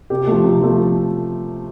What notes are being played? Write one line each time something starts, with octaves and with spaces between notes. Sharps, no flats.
C3 G4
F3 A3
C3
F3 A3